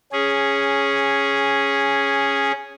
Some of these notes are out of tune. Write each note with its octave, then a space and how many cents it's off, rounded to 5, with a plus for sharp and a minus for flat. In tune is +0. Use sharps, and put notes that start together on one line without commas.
C#4 +0 G#4 -5